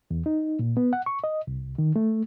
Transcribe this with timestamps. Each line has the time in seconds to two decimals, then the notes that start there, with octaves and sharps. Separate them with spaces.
0.11 E2
0.26 D#4
0.59 A#2
0.77 B3
0.93 F#5
1.06 C#6
1.24 D#5
1.47 C2
1.78 D#3
1.96 A3